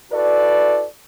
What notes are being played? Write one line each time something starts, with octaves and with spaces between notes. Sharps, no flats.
E4 F#4 A4 B4 D5